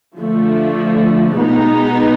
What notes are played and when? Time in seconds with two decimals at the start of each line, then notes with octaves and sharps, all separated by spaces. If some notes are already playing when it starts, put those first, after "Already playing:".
0.17 D3 F3 A3
1.35 B2 G#3 B3 D#4